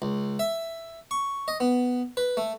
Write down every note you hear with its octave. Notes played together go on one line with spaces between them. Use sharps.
C#2
E5
C#6
D#5
B3
B4
A3